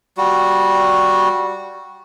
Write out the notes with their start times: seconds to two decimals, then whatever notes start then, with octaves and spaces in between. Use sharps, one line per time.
0.18 G3 F#4